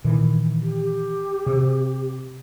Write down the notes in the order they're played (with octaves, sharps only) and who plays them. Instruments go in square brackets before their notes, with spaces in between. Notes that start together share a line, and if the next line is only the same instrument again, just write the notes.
[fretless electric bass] A#2 D#3 E3
[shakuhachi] G4
[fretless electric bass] C3